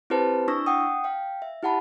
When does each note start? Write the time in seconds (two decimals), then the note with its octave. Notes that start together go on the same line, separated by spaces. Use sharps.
0.10 C4 E4 G4 B4 C5 A5
0.48 D4 E4 C#6 E6 A#6
0.66 F#5 G5 D#6
1.04 F5 G5
1.42 E5
1.63 E4 G4 F#5 A5 B5